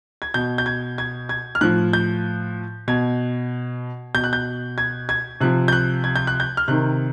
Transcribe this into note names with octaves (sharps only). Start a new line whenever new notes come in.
G#6
B2 G6
G6
G#6
G#6
G#6
F6
A2 F3 F#6
G6
B2 G#6
B2 G6
F#6
G6
G#6
G#6
C3 F3 F#6
G6
F#6
G#6
G6
F#6
G6
F6
C3 D#3 F#6